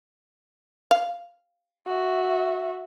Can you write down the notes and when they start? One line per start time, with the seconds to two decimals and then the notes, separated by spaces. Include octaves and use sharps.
0.91 F5
1.87 F#4 E5